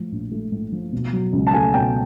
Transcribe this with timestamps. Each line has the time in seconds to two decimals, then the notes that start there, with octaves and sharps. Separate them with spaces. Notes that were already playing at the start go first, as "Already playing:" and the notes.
Already playing: A2 F3
0.12 A#1
0.31 A3
0.52 A2
0.72 F3
0.93 B2
1.13 F#3
1.33 C#2
1.47 A5
1.53 A3 G#5
1.74 B2 G5